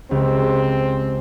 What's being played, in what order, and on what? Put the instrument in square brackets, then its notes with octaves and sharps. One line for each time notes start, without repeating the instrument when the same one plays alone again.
[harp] C#2 G4 [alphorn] C4